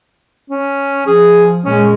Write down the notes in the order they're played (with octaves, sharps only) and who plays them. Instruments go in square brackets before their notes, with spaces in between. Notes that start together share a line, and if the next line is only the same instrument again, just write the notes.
[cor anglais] C#4
[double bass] F3 [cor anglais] G#4
[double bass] A#2 G#3 [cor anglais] C#4